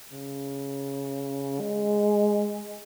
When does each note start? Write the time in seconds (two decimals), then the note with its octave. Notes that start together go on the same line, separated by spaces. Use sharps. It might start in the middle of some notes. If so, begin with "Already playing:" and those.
0.12 C#3
1.60 G#3